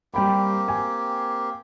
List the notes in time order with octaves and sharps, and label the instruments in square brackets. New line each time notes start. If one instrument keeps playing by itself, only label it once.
[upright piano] G3 G5 B5 [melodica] A#3 C4 G4
[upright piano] G#5